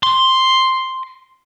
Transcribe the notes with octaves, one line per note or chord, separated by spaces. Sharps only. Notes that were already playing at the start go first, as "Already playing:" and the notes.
C6